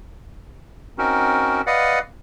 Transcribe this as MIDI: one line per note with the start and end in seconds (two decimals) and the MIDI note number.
0.98 1.61 60
0.98 1.61 61
0.98 1.61 63
0.98 1.61 66
0.98 1.61 70
1.67 1.99 71
1.67 1.99 74
1.67 1.99 75
1.67 1.99 77
1.67 1.99 78